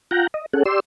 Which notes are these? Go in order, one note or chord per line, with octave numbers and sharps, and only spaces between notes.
F4 F#5 G5 A#5
D#5
C#4 G#4 A4 F#5
G4 D5 C6 E6